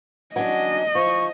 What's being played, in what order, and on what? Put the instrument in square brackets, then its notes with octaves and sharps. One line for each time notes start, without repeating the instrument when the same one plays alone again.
[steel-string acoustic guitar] F#3 C#4 D4 [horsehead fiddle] D#5
[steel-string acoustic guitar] F3 [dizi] C#6